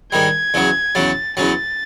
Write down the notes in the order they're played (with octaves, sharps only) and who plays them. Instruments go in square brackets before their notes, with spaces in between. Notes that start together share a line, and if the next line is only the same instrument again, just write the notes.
[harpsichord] G#2 D#3 G3 [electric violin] G#6
[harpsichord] E2 C#3 F#3
[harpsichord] E2 C#3 F#3 [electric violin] A6
[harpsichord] E2 C#3 F#3 [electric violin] A6